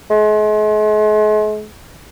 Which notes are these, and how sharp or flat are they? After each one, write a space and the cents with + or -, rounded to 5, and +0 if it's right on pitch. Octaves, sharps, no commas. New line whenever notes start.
G#3 +40